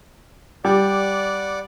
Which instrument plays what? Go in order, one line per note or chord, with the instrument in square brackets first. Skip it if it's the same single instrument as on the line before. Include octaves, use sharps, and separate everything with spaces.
[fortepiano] G3 [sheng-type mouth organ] D5 F#5 D6